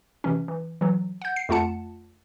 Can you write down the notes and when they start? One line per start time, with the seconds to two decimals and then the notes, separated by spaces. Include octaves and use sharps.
0.24 C3 E3 C#4
0.48 E3
0.81 E3 F#3
1.22 F#5 G6
1.36 C7
1.49 F2 A3 F4 F#5 A5 C#7